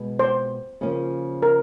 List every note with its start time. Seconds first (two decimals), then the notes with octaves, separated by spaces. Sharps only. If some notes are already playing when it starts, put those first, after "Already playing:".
Already playing: B2 G#3 B3
0.19 C5
0.81 C#3 F3 A#3 C#4 F4
1.43 A#4